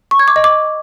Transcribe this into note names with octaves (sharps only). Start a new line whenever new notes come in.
C#6
G#6
D6
D#5
D6